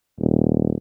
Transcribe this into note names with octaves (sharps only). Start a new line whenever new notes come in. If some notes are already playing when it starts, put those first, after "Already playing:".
D#1